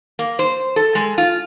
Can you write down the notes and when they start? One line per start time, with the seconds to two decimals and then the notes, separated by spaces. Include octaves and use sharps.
0.19 A#3
0.39 C5
0.76 A4
0.95 G#3
1.18 F4